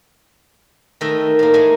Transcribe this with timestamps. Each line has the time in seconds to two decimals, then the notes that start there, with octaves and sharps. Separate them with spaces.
1.01 D#3 A3 B4 D#5 E5
1.39 A2 A#3
1.54 G#3 A3 D#5 G#5